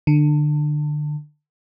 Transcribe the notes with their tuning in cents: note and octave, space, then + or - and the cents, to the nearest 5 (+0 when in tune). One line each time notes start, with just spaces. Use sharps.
D3 +25